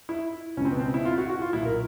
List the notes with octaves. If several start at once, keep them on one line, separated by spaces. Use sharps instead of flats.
E4
C#2 B2 C4 C#4
B3
C4
E4
F4
F#4
F#4
F4
B1 A#2 E4
A#4